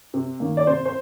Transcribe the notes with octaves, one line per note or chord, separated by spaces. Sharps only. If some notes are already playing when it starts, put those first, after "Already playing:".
C3
D#3 A#3
D5
C3 C5
C5